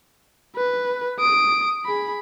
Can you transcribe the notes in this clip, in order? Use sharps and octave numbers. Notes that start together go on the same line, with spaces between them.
B4
D#6 D7
G#4 B5